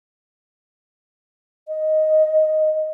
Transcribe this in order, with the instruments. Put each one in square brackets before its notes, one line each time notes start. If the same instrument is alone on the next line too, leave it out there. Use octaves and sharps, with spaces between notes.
[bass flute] D#5